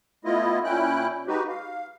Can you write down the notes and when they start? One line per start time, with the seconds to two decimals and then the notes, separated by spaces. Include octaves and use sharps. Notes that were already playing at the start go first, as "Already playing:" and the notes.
0.25 A3 B3 E4 F4 D#5
0.64 A#2 C#4 E4 G5 F#6
1.27 G#3 D#4 F#4 G4 B4
1.48 F5